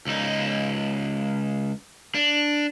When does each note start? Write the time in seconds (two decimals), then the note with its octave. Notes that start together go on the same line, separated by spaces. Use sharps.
0.07 C#2 D#4
2.15 D4